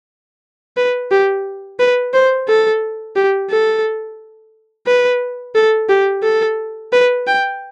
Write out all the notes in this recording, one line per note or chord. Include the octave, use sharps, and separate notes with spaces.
B4
G4
B4
C5
A4
G4
A4
B4
A4
G4
A4
B4
G5